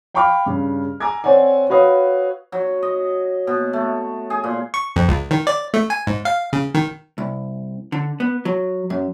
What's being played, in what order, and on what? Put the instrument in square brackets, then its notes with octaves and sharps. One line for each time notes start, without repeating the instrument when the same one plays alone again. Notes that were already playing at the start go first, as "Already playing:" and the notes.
[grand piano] F5 G5 B5 C#6 D6 F6
G2 C#3
G#5 A#5 D6 E6 G#6
C4 C#5 D5 F#5 G#5
F#4 B4 C#5 F5 D#6
[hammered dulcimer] F#3
D#5
B2
A3
G#4
A#2
[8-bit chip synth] C#6
F2
C#2
D#3
D5
A3
G#5
G#2
F5
C#3
D#3
[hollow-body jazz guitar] C2
D3
B3
F#3
F#2